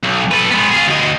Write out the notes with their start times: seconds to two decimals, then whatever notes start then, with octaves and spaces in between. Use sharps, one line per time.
0.03 B1
0.31 A4 B4
0.51 G#3 B3
0.70 F4 G#4
0.88 D2 D#5